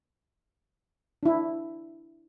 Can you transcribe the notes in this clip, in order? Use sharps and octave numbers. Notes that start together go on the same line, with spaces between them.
D4 E4